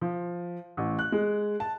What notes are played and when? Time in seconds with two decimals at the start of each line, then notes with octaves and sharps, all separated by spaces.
0.01 F3
0.77 A1
0.99 F#6
1.12 G#3
1.60 A5